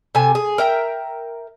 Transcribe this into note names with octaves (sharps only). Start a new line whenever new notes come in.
C3 A4 G#5
G#4
A#4 E5 G5